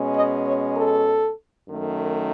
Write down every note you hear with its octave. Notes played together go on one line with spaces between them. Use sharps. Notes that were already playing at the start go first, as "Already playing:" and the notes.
Already playing: B2 G#3 C#4
D#5
C#5
A4
F#2 D#3 A3